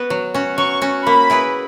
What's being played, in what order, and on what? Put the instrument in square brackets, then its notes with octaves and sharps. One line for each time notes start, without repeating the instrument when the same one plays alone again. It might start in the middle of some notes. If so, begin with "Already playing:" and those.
Already playing: [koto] B3 F#4 B4
F#3
C#4 F#4
[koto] F#3 [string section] C#6
[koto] C#4 F#4
[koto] A#3 [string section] B5
[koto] E4 G#4 B4